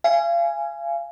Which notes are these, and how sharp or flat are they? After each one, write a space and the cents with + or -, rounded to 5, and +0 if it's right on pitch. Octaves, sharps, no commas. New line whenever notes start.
F5 -35 G#5 +0